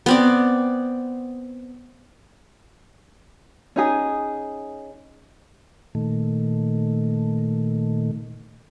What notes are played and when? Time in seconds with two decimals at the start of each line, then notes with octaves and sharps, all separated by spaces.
0.06 B3 C4 D5
3.76 C#4 D#4 G#4 G#5
5.95 A#2 D#3 A3